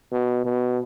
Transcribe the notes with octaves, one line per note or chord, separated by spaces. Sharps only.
B2
B2